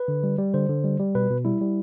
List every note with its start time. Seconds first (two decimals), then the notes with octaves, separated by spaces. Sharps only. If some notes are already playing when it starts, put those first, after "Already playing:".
Already playing: B4
0.08 D3
0.23 G3
0.38 G3
0.54 D3 C5
0.69 D3
0.84 G3
0.99 G3
1.15 B2 B4
1.30 B2
1.45 G3 E4
1.61 G3